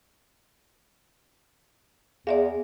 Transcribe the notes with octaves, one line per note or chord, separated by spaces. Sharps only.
E2 G#4 D5 E5 F5